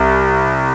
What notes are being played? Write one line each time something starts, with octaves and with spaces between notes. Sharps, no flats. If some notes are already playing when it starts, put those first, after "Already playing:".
Already playing: C2